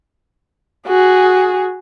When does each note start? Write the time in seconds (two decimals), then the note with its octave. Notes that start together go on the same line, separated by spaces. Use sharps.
0.88 F#4 G#4